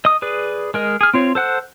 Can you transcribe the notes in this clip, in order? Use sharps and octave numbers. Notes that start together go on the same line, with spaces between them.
D#5 D#6
G#4 B4 D5
G#3 A#4 D#5
G#4 F6
C4 F4 C#5
A4 C5 F#5 F#6